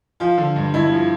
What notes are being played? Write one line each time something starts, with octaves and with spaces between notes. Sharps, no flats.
F3 F4
D3
G2
G2 E4
F3